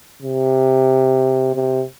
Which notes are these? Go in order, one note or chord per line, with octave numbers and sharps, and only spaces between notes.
C3
C3